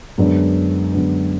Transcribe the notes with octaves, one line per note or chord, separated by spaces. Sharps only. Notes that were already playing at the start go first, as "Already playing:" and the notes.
F#2 D3 G#3 B3 D4
F#2 D3 G#3 B3 D4